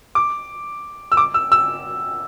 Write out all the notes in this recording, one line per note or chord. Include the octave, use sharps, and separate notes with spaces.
D6
E6
D6
E6
E6